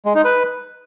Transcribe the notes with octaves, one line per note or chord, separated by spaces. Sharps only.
G#3
D#4
B4